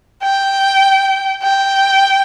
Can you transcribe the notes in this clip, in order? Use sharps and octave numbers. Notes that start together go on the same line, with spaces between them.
G5
G5